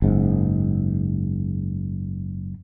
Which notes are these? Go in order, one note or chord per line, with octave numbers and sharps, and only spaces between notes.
F#1 G#2